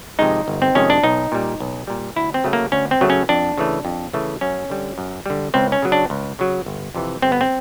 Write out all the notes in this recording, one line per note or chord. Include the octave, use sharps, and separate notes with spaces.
F2 C3 D#3 G#3 D#4
G1
C4
F2 C3 D#3 G#3 C#4
D4
B1 D#4
A#2 G3
B1
A#2 G3
D2 E4
C4
C#3 F#3 A3
A#3
D2 C#4
C4
C#3 F#3 A3
C#4
F2 D4
C#3 E3 A3
F2
C#3 E3 A3
F#2 C#4
D3 G3
F#2
D3 G3
C#2 C4
C#4
C#3 F#3
D4
C#2
C#3 F#3
G1
F2 C3 E3
G1 C4
B3
C4